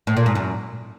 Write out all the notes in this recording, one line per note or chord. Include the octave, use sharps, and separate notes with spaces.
A2
A#2
G#2
F#2